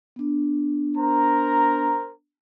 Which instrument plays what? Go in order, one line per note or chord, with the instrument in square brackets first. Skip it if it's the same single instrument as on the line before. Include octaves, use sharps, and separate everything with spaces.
[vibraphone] B3 D4
[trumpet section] A#4 C5 A#5